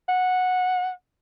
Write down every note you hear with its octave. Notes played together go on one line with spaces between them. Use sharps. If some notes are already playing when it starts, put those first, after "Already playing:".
F#5